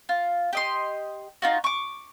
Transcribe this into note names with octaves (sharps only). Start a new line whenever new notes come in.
F4
G4 D#5 C6
D#4 F4 F#4
C#6 D6